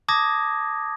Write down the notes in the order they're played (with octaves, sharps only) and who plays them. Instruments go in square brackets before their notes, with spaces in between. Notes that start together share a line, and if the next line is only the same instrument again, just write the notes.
[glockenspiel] A5 D6 D#6 G#6 A#6